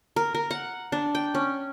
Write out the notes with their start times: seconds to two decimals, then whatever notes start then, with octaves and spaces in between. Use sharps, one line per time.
0.16 A#4
0.35 A#4
0.51 F#5
0.92 D4
1.15 G5
1.35 C#4